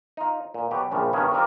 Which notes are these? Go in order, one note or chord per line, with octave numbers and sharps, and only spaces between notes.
D#4 F4
A#2
B2 F#3 G4 B4
A#1 C#3 F3 G3
G2 D#3 B3 C#4 C#5
G3 C4 D#4 F4 A#4 D5